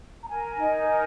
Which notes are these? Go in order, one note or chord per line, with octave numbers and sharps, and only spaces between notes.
A#5
A#4 G#5
D#4
A#4